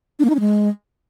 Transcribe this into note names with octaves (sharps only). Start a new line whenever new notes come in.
D4
A#3
D#4
C#4
G#3